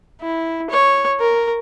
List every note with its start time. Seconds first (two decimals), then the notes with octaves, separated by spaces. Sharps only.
0.21 E4
0.70 C#5
1.20 A#4